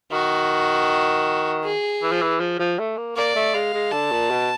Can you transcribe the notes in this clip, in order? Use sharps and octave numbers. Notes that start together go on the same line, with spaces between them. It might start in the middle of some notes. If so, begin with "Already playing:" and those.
D#3 F#4
G#4
E3
F3
E3
F3
F3
A3
A#3
A#3 D5
A3
G#3 F5
G#3
D3 A5
A#2
B2